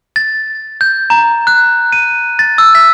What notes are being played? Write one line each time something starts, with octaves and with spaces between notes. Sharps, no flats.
A6
G6
A#5
F#6
D#7
A6
E6
B6